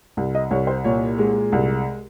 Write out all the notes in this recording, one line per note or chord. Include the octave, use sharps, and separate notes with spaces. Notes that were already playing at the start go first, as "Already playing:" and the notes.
C2
D#5
C2 C#5
C5
A#2 C#5
G#3
C2